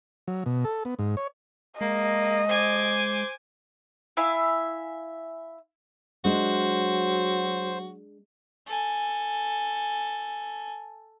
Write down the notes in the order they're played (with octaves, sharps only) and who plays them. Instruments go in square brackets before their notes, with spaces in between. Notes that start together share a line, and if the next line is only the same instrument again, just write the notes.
[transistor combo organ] F#3
B2
A4
B3
G#2
C#5
[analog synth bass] G#3 [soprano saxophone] A#3 [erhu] D#5
[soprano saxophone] C5 [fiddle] G#5 D6
[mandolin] E4 E5 F5 G#5
[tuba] F#3 [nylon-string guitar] G#3 D4 [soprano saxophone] F#4 [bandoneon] C5
[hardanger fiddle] A4 G#5